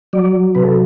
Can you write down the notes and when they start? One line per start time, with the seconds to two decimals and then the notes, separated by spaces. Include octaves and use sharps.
0.13 F#3 D5
0.55 C3 B4
0.64 A4